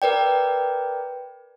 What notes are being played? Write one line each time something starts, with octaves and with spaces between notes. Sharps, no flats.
A#4 B4 D5 G5